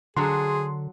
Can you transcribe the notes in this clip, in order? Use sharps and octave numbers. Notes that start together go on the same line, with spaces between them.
D3 F#3 D4 F#4 G#4 C6